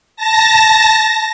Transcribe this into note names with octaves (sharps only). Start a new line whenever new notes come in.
A5 A#6